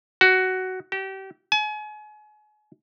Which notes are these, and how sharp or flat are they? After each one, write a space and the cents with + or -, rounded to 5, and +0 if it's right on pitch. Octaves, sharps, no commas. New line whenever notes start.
F#4 +10
G4 -30
G#5 +35